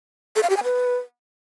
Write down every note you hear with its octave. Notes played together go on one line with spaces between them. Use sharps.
A4
F5
G4
G#5
B4